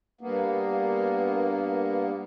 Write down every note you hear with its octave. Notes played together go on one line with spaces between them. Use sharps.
G2 A#3 B3